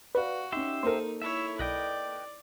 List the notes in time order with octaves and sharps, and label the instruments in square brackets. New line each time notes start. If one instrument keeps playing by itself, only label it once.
[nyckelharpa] F#4 [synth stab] B4 [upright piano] D5 F5
[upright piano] C#4 D#4 [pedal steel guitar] G4 E5 C6
[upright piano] A#3 A4 [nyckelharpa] D#4 [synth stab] A#4 C5
[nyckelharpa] E4 C#5 [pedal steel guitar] E5
[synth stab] B1 [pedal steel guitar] B4 D#5 G5 [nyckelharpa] D5